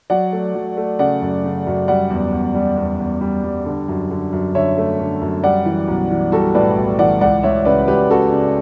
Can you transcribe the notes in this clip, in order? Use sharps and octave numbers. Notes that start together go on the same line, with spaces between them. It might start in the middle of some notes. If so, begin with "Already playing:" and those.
F#3 D5 F#5
A3
F#3
A3
C#3 D5 F#5
F#2
C#3
F#2
G3 D5 F#5
E2
E2
G3
E2
E2
G3
G3
D3
F#2
D3
F#2
D3 C#5 E5
A3
D3
F#2
G3 D5 F#5
E3
B1
E3
G3 F#4 A4
A2 B4 D5
B1
E3 D5 F#5
C#2 D5 F#5
C#2 C#5 E5
C#3 B4 D5
C#2 G4 B4
C#3 F#4 A4
C#3